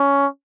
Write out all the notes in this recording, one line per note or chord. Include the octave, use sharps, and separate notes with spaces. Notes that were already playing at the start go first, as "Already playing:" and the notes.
Already playing: C#4